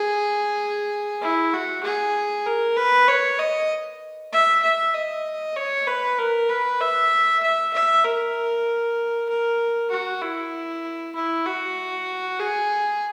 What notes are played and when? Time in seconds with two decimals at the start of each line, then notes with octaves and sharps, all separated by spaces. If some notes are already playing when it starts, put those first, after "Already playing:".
Already playing: G#4
1.22 E4
1.53 F#4
1.83 G#4
2.46 A#4
2.77 B4
3.08 C#5
3.39 D#5
4.32 E5
4.62 E5
4.94 D#5
5.56 C#5
5.87 B4
6.18 A#4
6.49 B4
6.80 E5
7.42 E5
7.73 E5
8.04 A#4
9.29 A#4
9.90 F#4
10.21 E4
11.15 E4
11.45 F#4
12.39 G#4